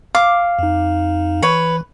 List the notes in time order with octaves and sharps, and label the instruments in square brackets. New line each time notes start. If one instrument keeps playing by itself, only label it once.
[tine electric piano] F5 [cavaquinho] D6
[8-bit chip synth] F2 D#4
[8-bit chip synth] E3 [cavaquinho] B4 C#5